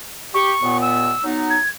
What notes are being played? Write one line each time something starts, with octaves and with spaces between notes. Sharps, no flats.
G4 C#6
D#2 A#2 B3
E6
F#3 B3 D#4
G#6